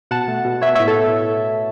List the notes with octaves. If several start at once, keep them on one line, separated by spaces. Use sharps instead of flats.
B2 F#5 A5
A3
B2
B3 C#5 E5
C#5 E5
A2
A4 C#5